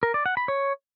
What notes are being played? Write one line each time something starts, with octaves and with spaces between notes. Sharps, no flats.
A#4
D5
F#5
B5
C#5